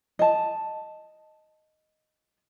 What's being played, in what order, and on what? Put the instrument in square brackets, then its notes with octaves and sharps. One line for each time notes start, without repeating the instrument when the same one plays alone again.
[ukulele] D#5 A5